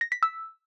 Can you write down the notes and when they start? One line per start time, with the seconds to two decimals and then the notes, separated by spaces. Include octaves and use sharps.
0.01 A#6
0.12 B6
0.23 E6